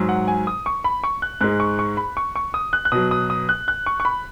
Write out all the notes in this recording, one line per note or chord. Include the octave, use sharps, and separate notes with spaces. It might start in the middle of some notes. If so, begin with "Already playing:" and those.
Already playing: G#2 F#3
F#5
G#5
D#6
C#6
B5
C#6
F#6
G#2 G#3 F#6
C#6
C#6
B5
C#6
C#6
D#6
F#6
F#6
B2 F#3 D#6
D#6
D#6
F#6
F#6
C#6
C#6
B5